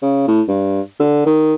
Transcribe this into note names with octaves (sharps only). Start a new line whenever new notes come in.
C#3
A2
G2
D3
D#3